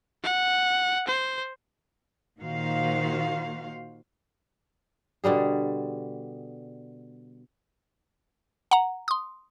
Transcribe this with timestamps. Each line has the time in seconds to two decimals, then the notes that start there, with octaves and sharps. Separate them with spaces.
0.24 F#5
1.08 C5
2.40 A#2 D#3 F#4 C5 F5
5.24 B2 D3 G3 G#4
8.71 F#5 A#5
9.08 C6 D#6